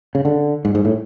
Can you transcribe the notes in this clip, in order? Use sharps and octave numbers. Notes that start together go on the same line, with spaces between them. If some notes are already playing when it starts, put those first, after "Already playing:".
C#3
D3
G#2
G#2
A2